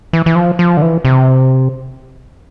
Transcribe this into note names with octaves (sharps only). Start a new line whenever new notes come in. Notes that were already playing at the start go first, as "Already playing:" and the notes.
E3
E3
F3
F3
D3
E3
C3